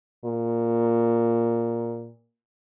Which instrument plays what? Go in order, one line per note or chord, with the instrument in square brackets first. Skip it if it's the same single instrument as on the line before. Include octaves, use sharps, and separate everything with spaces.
[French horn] A#2